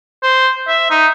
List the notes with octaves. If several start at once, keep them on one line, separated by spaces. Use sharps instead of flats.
C5
E5
D#4